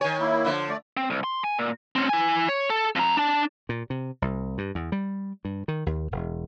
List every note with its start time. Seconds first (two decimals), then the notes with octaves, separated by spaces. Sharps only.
0.01 D#3 C#5 G#5
0.20 A#3 E4
0.45 D3 F3
0.69 A3 D5
0.97 C4
1.10 C2
1.24 C6
1.44 G#5
1.59 A#2
1.96 C4 C#4
2.09 E4 G#5
2.49 C#5
2.70 A4
2.96 F2 A#5
3.17 D4 A5
3.69 A#2
3.90 C3
4.22 C2
4.58 G2
4.75 E2
4.92 G3
5.45 G2
5.68 D#3
5.86 D#2
6.11 E1